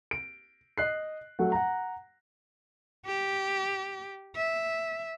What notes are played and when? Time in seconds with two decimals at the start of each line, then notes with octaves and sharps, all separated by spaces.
0.11 D7
0.78 D#5 F#6 C7
1.39 F#3 A3 F#5
1.52 F#5 A#5
3.06 G4
4.36 E5